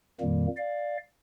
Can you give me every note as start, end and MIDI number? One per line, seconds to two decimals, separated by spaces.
0.21 0.47 41
0.21 0.47 46
0.21 0.47 51
0.21 0.47 55
0.21 0.47 58
0.57 0.97 74
0.57 0.97 77